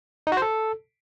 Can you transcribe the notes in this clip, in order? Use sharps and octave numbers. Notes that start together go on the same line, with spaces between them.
D#4
F#4
C5
A4